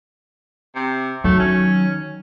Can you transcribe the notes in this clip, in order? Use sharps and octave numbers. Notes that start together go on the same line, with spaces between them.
C3
D#3 F#3 A3
C#4